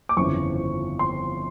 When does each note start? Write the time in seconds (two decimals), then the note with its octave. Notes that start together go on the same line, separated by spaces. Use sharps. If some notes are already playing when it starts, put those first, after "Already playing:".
0.09 D6
0.17 G1 F2 C#3 E3 C#6
0.99 C6